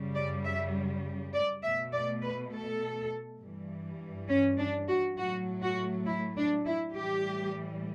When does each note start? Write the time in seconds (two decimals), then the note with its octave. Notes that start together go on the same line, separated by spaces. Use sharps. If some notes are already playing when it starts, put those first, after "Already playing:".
Already playing: F#2 C#3 G3
0.15 D5
0.44 E5
1.33 D5
1.63 B2 A3 E5
1.93 D5
2.22 B4
2.52 A4
3.41 G2 E3 G3
4.29 C#4
4.59 D4
4.88 F#4
5.17 A2 F#3 A3 F#4
5.62 F#4
6.06 E4
6.36 D4
6.66 E4
6.95 A2 E3 G3 G4